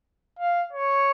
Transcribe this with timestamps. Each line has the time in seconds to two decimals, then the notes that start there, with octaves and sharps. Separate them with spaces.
0.39 F5
0.73 C#5